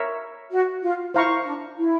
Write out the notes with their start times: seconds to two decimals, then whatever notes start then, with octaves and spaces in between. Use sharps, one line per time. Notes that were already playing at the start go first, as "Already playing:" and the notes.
Already playing: A#4 C#5 E5
0.50 F#4
0.82 F4
1.14 E4 C5 F5 A#5 C#6
1.45 D4
1.77 E4